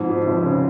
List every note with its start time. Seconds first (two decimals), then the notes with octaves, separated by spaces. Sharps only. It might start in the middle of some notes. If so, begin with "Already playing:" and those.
Already playing: F2 G#2
0.09 F3
0.27 F1
0.43 C#3